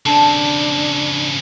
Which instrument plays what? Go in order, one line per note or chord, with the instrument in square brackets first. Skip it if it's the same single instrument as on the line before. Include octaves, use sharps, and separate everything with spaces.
[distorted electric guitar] C#3 C4 [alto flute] D4 [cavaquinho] A4